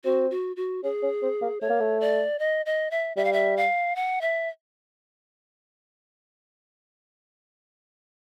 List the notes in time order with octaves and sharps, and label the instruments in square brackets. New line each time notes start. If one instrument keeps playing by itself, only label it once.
[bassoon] C4 [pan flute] F#4
[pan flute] F#4
F#4
[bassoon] C#4 [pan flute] G#4
[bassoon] C#4
C4
A#3
[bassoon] A3 [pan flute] C#5
[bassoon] A#3
A3
[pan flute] D5
D#5
D#5
E5
[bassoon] G3 [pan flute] E5
[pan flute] F5
E5
F5
F#5
E5